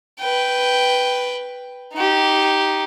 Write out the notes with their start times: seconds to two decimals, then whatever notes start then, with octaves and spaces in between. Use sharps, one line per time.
0.20 B4 G5
1.93 D#4 G4